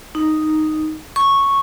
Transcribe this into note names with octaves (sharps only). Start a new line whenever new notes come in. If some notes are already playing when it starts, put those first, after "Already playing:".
D#4
C#6